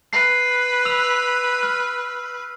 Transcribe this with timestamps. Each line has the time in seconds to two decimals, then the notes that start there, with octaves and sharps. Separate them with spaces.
0.13 B4 C7
0.85 E6 F7
1.63 F6